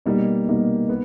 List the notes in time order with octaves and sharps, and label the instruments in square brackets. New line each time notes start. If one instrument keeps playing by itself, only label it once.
[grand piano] B2 G3 A#3 D#4
B2 G3 A#3 D#4
B3